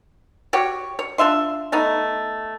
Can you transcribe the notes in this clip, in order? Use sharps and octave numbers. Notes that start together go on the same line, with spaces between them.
F#4 G4 C#5
C#5
D4 F4 E5 C6
A3 B3 D#4